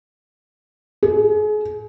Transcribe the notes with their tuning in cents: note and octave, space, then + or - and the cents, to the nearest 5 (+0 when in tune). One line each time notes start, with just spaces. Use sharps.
G#4 +35